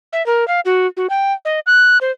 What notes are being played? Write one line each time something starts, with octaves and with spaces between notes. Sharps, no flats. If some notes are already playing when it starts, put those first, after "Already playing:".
E5
A#4
F5
F#4
F#4
G5
D#5
F#6
C5